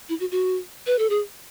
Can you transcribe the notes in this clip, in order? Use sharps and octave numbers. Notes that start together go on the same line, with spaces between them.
E4
F#4
F#4
B4
A4
G#4